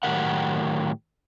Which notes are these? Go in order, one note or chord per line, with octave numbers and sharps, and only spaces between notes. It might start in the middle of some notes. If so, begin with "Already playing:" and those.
A2 D#3 F#3 G4 A#4 F#5